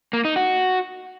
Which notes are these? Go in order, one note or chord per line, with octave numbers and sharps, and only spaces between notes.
A#3
D#4
F#4